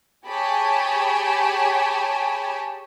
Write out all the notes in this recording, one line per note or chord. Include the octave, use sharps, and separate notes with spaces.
G4 G#4 C#5 G#5 A5 B5